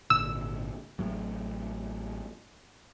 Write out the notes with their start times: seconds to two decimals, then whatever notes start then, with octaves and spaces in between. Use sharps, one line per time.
0.10 G#1 A#2 D3 E6
0.99 A1 A2 F#3